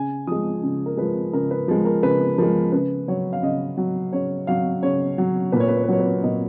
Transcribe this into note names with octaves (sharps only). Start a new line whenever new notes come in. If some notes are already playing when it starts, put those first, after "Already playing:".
Already playing: C#3 G#5
F3 G#3 D#6
C#3
A#4
F3 G#3 B4
C#3 A#4
B4
F3 G#3
A#4
C#3 B4
F3 G#3 A#4
C#3 B4
F#3 C#5
F5
C#3 D#5
F#3
C#3 C#5
F#3 F5
C#3 C#5
F#3
A#2 B4
C#5
B4
C#5
B4
F#3 C#5
B4
A#2 D#5